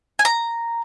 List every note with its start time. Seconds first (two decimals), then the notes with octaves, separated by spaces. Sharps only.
0.19 G#5
0.25 A#5